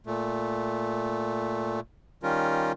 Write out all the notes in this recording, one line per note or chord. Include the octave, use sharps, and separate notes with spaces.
A#2 A3
D#3 G3 C#4 F4 A#4